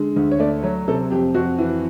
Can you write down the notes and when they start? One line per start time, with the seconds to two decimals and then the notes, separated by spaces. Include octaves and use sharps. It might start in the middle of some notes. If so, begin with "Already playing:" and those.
Already playing: D3 G#3
0.16 D2
0.31 C#5
0.39 A3 D5
0.63 F#3 C#5
0.88 C3 A4
1.11 F2 G4
1.34 F2 F#4
1.58 E3